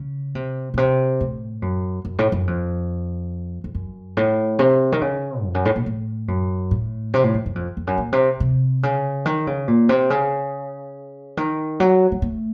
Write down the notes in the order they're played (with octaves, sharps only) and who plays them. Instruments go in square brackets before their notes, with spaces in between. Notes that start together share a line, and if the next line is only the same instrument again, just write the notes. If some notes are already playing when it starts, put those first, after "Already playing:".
Already playing: [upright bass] C#3
C3
A#2
C3
A2
F#2
F#2
A2
F#2
F2
F2
F#2
A2
C3
D#3
C#3
F2
F#2
A2
A#2
A2
F#2
A2
C3
A2
F#2
F#2
F2
F2
F#2
A#2
C3
C3
C#3
D#3
C#3
A#2
C3
C#3
D#3
F#3
F#3
A3